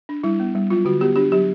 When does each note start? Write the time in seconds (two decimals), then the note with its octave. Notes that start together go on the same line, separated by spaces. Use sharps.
0.09 D4
0.23 G3 E4
0.40 B3
0.55 G3
0.70 F#3 F4
0.85 D3 F#4
1.01 B3 G4
1.16 D4 G4
1.32 F#3 G4